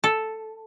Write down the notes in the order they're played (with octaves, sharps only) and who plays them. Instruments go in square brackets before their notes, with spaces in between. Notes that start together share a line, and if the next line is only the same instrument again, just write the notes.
[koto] A4